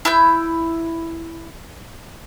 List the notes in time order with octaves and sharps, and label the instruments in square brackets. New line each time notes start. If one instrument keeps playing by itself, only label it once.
[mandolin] E4 E6 G6